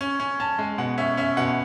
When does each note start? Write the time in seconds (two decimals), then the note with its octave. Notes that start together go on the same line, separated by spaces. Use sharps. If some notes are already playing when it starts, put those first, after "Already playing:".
0.01 C#4
0.20 C#4
0.40 C#4 A5
0.59 G#3
0.78 B2 F#5
0.98 C#4 E5
1.17 C#4 E5
1.37 B2 F#5